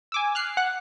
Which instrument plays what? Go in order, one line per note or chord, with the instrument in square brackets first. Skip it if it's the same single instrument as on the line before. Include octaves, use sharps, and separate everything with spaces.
[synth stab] G#5 D6 E6
F6 F#6 C7
F#5 F#6